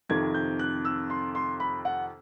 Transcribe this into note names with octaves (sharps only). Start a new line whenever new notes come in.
F2 C3 D#3 G#6
G6
F#6
E6
C6
C6
B5
F#5